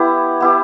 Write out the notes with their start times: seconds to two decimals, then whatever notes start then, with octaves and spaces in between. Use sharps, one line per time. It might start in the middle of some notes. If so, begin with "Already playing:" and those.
Already playing: B3 E4 G4
0.40 B3 E4 G4